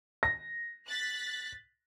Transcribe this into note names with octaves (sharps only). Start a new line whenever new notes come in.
A#6
F#6 A6 B6